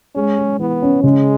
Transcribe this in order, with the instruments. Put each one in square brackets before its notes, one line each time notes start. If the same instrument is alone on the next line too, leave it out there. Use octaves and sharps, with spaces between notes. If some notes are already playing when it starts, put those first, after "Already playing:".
[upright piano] G#3 [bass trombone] C#4
[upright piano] G#3
[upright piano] E3 [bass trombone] B3
[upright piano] C#4
[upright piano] C#3 [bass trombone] G#3